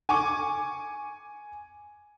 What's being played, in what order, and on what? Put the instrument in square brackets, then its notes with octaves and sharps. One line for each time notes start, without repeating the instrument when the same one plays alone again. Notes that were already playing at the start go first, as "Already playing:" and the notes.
[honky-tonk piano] G#5 C#6 D6